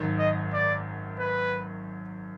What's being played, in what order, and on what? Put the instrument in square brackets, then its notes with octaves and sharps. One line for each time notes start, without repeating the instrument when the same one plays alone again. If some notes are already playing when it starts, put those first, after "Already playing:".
Already playing: [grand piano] G#1 F#2 D#3
[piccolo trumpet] D#5
D5
B4